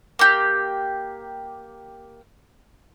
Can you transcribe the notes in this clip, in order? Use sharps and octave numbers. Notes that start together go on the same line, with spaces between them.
A#3 G4